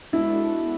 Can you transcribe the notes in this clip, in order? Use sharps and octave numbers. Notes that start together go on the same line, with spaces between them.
G#3 B3 D4 E4 F#4 A4